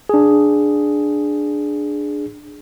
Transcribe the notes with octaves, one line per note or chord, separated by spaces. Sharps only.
D4 G#4